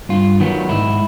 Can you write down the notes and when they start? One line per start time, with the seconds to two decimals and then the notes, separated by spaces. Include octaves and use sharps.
0.09 G2 F4
0.40 D#3 F#3 B3
0.69 G#2 E4